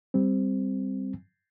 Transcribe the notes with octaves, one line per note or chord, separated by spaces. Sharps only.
G3 C4